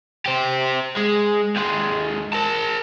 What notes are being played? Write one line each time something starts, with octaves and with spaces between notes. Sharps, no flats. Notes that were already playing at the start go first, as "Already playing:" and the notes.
G4 C5
G#3
D#2 G#3
A#4 A5